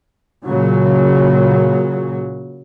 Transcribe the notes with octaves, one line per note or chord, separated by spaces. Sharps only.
A#2 C#3 F#3